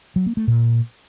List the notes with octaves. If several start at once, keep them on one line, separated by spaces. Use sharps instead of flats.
F#3
A#3
A3
A#2